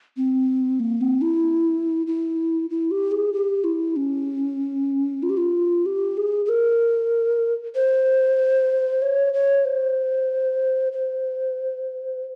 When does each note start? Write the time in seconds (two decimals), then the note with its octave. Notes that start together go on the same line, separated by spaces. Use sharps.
0.17 C4
0.80 A#3
1.01 C4
1.21 E4
2.07 E4
2.70 E4
2.91 G4
3.12 G#4
3.33 G4
3.64 E4
3.96 C#4
5.23 F4
5.30 G4
5.37 F4
5.86 G4
6.17 G#4
6.45 G#4
6.49 A#4
7.76 C5
9.02 C#5
9.34 C#5
9.65 C5
10.93 C5